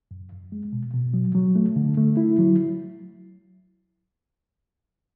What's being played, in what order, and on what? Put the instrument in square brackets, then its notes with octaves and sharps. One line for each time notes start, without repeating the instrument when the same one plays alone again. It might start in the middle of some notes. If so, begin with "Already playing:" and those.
[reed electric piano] F#2
F#2
G#3
B2
B2
F#3
F#3
A3
D3
A3
E4
F#3